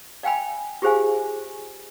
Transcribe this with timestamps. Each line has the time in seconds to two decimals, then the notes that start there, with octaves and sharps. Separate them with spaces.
0.23 D5 F5 G5 G#5 B5
0.82 F4 G4 G#4 C5 F5 G#5